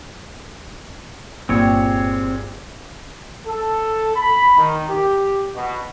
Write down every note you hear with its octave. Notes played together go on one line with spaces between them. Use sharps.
G1 A#2 C4 G4 G#4 C#5
A4
B5
D#3
G4
B2